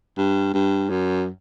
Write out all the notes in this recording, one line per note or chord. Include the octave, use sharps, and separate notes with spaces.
G2
G2
F#2